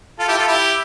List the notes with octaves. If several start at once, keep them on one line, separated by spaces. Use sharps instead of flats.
F4 A4
E4 G4
F4 A4
E4 G4